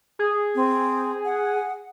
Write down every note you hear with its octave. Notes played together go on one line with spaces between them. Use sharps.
G#4
C4
F#5